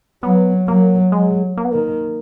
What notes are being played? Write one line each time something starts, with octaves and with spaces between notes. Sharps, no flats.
F#3 B3
F#3 A#3
F#3 G#3
A#3
B3
D#3 A#3